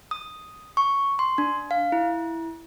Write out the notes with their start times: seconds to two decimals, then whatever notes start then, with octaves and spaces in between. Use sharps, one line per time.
0.11 D#6
0.77 C#6
1.19 C6
1.38 D4
1.71 F5
1.92 E4